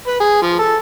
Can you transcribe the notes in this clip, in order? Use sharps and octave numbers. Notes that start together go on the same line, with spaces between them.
B4
G#4
F3
A4